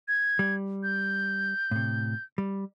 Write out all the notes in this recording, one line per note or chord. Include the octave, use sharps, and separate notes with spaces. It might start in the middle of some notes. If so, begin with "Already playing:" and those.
G#6
G3
G6
A2 C3
G3